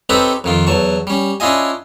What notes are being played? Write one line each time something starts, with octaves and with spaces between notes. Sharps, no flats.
C4 D#4 G4 A4 B4 C#5
F2 D#3 F4
E2 F#3 A5 C#6
G3 C#4
C#4 D4 E4 F4 D#5 G#5